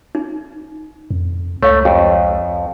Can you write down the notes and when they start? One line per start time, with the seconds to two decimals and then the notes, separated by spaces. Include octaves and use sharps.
0.15 D#4
1.10 F2
1.63 C#2 A3 C#5 F5
1.85 F2 G4